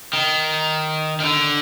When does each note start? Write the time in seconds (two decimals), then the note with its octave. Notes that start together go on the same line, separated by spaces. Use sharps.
0.13 D#3
1.20 D#3
1.24 D3